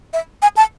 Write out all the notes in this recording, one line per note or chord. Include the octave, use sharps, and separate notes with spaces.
E5
G#5
A5